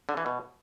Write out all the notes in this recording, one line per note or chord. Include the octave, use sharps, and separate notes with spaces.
D3
E3
B2